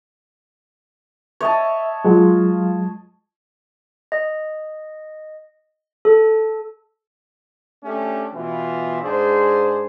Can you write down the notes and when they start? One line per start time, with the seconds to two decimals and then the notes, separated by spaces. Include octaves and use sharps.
1.41 C#5 D#5 E5 A5
2.05 F#3 G#3 F4
4.12 D#5
6.05 A4
7.83 A3 C#4 D4 G4
8.35 B2 E3 E4 F4
9.03 G#2 D4 G#4 C5